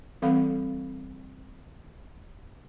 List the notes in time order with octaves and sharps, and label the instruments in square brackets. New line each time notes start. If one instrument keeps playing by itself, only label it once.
[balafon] E3 G3 C4 A4 F5 B5